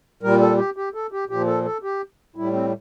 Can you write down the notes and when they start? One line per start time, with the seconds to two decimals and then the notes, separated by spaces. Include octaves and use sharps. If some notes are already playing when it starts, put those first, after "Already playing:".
0.23 A#2 G3 A#4
0.41 A4
0.58 G4
0.76 G4
0.94 A4
1.12 G4
1.29 A#2 F3 G4
1.47 A4
1.65 A4
1.83 G4
2.35 A2 G3 E4
2.53 C4